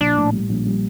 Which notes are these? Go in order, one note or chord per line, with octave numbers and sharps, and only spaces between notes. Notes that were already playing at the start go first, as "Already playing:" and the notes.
A#1 D4
A2
G3
A#1
G3